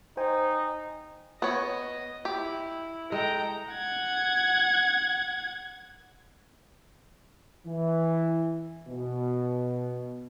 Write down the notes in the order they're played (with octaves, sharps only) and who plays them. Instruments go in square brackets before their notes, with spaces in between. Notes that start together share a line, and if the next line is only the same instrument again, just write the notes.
[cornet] D#4 [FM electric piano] C5 G5 G#5
[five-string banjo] B3 C#5 [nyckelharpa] D#5
[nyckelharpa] E4 [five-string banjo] G4
[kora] G#3 A4 [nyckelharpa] G5 A#5
[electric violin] F#5 G#6
[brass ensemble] E3
B2